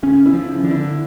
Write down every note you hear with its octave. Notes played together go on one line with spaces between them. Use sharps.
C#3 C#4
E4
F3
C#3
D3
E4